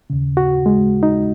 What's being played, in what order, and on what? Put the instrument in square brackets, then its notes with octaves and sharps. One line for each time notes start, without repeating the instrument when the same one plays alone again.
[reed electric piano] D#2 C#3
F#4
G#3
D#4